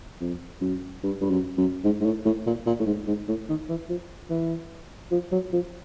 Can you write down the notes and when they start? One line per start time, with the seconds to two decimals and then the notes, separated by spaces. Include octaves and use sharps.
0.21 F2
0.61 F#2
1.03 G2
1.21 G2
1.30 F#2
1.57 F#2
1.84 G#2
2.00 G#2
2.05 A2
2.25 A2
2.46 A#2
2.66 A#2
2.80 A2
2.86 G#2
3.07 G#2
3.28 A2
3.49 D#3
3.69 E3
3.89 F3
4.30 E3
5.11 F3
5.32 F#3
5.53 F3